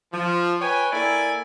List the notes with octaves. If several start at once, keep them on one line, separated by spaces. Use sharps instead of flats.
F3
B4 C#5 G5 G#5
A#3 E4 A4 D5 G#5